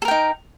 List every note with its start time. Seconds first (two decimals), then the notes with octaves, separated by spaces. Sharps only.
0.02 A4
0.05 A#4
0.08 G5
0.11 D#4